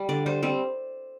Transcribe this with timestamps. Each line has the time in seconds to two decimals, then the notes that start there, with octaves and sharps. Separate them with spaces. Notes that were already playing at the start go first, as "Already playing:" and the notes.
Already playing: G3
0.09 D3 D5
0.26 G3 C5
0.43 G3 C4